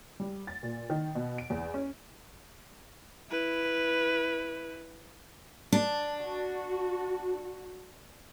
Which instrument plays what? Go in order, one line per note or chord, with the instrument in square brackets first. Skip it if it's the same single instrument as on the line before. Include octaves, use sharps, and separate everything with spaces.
[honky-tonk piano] G3
A6
A#2
D#3
B2
D7
E2
C#4
[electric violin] E4 B4
[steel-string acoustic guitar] D4
[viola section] F#4